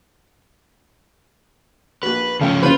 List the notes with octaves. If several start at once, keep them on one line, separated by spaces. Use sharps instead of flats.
A#1 F#4 B4
C#3 F3 A3 C#4 F5 G5
F#1 F4 B4 C5